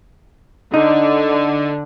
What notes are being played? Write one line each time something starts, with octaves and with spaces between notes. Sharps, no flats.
D3 D#4